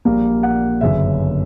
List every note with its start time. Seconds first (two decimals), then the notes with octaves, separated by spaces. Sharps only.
0.05 A#1 A#2 G3 A#3
0.43 F#5
0.81 G1 F#2 C#3 E5